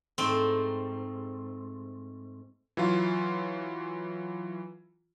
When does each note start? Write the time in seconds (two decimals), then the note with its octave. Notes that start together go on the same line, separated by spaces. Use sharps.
0.18 G#2 A3 C4
2.77 E3 F#3 F4